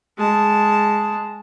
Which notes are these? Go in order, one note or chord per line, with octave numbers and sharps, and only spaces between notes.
G#3 A5